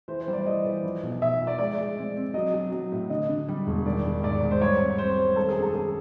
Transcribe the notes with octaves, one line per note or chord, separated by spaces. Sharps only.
E3 C5
C5
G3
D5
E3 D#5
E3
F3
B1
B1 E5
F3
D5
G#3 D5
G#3
C4
C4
F#3 D#5
F#3
F#3
A2
D3 D#5
D3
G3
E1
D#3 D5
D#3
G#2 D5
G#2
C5
G3 C#5
C4
G3 C5
G3
D#3 A4
G#4
F#2
A4
F#2 G#4